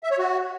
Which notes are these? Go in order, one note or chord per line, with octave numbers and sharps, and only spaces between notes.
E5
C#5
F#4